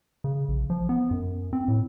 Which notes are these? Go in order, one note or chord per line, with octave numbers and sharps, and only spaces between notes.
C#3
A#1
F3
B3
F#2
C4
A2